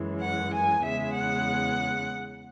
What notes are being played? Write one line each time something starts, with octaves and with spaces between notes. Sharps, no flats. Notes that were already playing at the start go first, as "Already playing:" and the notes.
Already playing: F#2 E3 G#3
F#5
G#5
E2 C#3 G#3 E5
F#5